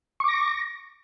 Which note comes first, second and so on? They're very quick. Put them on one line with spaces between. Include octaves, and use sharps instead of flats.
C#6 D6 A#6